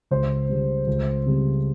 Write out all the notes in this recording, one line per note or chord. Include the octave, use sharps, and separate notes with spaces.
C#2 C5
C#3 G3
C#2
C#3 G3 C4